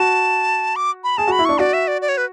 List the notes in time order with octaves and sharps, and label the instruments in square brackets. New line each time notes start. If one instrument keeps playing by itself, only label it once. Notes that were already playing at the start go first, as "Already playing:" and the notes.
Already playing: [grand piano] F#4 [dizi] A5
[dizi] D6
B5
[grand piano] G#4 [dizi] A5
[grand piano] F#4 [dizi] B5
[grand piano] E4
[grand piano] D4 [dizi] C#6
[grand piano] F#4 [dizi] D5
[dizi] E5
D5
D5
C#5
B4